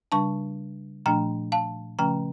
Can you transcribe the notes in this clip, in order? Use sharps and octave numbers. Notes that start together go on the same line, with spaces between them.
C#3 G3 D4 A5 C#6
A#2 F3 A3 D4 G5 A#5
F5 A5
C#3 F3 A3 C#4 G5 A#5